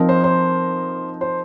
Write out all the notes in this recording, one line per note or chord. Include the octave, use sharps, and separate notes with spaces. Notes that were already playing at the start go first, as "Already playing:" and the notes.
Already playing: F3 C4 D#4 A#4
C5
C5
C5